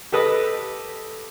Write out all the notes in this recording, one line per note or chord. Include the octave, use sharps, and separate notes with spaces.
G4 A4 B4 D#5